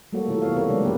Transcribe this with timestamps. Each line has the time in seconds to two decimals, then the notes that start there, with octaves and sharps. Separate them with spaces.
0.13 G3 A3 A#3 F#4 A4 C#5
0.28 C3 E3 E4 F4 A4 A#4
0.42 B3 E4 C#5 F5
0.56 C#3 C4 G4 A4 A#4 C#5
0.68 C3 F#3 G#3 D4 B4 D5
0.83 A#3 B3 G4 A#4 B4